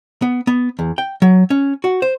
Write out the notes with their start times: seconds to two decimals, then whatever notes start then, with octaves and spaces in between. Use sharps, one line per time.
0.22 B3
0.47 B3
0.79 E2
0.98 G5
1.22 F#3
1.50 C#4
1.84 F#4
2.02 C5